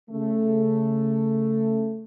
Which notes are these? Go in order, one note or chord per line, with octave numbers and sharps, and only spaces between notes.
C#3 A3